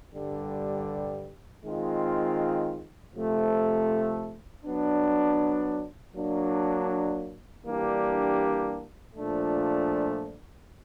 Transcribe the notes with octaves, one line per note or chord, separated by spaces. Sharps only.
G2 D3 G3
D#3 G#3 C4 F4
C3 F3 A3
F#3 B3 D4
F#3 A#3 D4
E3 G3 A#3 D4 G4
A#2 F3 A3 D4